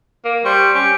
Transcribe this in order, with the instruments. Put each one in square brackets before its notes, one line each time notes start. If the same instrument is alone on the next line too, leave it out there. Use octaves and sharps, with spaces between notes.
[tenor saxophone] A#3
[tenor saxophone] G3 [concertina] C5 C#6
[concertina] C#4 C#6 [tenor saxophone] G4